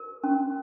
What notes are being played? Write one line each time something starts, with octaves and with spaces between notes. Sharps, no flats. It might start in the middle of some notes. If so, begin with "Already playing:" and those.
Already playing: A#4
C#4